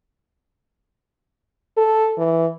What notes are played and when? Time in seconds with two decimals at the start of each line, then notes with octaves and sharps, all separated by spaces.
1.77 A4
2.18 E3